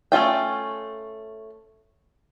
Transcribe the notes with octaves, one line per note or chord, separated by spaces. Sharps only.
A3 C#4 F4 G5